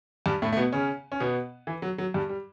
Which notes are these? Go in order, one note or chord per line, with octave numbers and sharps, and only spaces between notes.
G2 G3
A2 A3
A3
B2 B3
C#3 C#4
C#4
B2 B3
E3
F#3
F#3
G2 G3
G3